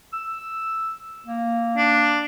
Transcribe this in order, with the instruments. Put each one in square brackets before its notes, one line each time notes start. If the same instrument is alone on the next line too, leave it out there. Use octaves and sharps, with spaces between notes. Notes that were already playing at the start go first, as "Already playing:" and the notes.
[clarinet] E6
A#3
[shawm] D4